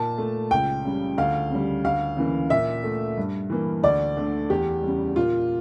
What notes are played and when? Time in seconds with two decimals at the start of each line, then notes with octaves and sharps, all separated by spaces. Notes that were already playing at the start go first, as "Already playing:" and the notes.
Already playing: A#2 A5
0.18 A3
0.51 C#2 G5
0.85 C#3 G3
1.18 D2 F5
1.50 C#3 G3
1.84 D2 F5
2.17 C#3 E3 A#3
2.50 A#2 E5
2.84 A3
3.18 G2
3.50 E3 A#3
3.83 D2 D5
4.17 D3 A3
4.50 E2 G4
4.83 C#3 G3
5.16 A#2 F4